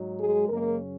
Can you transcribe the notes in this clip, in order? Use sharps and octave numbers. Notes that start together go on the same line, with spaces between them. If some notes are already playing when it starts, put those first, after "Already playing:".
Already playing: G#2 F#3 D#4
G#3 G#4
F#2 C#3 G#3 A#3 C#4 A#4